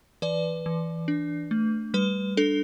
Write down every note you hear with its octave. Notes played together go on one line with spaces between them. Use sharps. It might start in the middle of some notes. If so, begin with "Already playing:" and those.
E3 B4 D5
E3
D4
A3
G3 B4
D4 A4